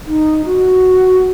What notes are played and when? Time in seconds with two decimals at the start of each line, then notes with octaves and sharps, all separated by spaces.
0.07 D#4
0.45 F#4